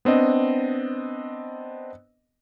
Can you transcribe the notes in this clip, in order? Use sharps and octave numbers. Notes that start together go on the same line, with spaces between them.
B3 C4 D4 D#5